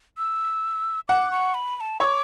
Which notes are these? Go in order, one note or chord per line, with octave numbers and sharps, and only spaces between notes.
E6
F#5 D6
C#6
B5
B5
A5
C#5 D6 E6